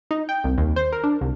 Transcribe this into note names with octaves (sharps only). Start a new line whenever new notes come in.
D#4
G5
C2
D#2
C5
A#4
D4
C2